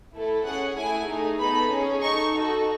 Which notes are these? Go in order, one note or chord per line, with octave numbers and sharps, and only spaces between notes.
A3 E4 A4
C#4 G#4 F#5
A3 E4 G#4 G#5
A3 D#4 G#4
B3 D#4 A4 B5
C#4 G#4
D#4 A4 C#6
D#4 F#4 A4